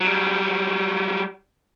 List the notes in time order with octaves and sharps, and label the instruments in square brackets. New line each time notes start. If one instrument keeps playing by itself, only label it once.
[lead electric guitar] F#3 G3